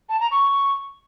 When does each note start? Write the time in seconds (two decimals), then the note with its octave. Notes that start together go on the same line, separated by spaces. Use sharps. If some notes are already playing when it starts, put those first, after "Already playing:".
0.09 A5
0.20 A#5
0.31 C#6